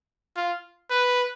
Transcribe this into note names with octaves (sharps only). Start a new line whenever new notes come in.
F4
B4